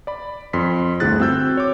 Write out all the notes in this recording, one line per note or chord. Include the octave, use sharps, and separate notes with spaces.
D5 B5
F2 C6 B6
G1 D2 E4 G#4 F#6 A6
C4 F#4 E6 G6
C#5 D6